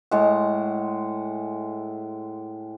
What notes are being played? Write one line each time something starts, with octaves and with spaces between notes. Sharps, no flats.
A2 G#3 F#5